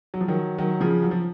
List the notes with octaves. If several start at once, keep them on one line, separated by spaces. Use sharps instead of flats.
F#3
F3
D#3 F#3
D#3 F#3
C#3 F3
F#3
F3